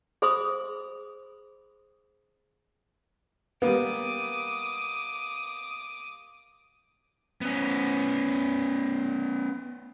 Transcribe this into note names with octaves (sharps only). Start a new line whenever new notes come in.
G#4 C5 B5 C6 D#6 E6
G3 A#3 B3 D6 D#6
B3 C#4